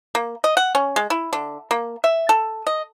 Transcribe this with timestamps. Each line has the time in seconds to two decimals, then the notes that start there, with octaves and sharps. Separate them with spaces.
0.15 A#3
0.44 D#5
0.57 F#5
0.75 C#4
0.96 G#3
1.10 E4
1.33 D3
1.71 A#3
2.04 E5
2.29 A4
2.67 D#5